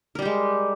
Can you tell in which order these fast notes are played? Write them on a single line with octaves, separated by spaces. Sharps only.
A#4 G3 G4 G#3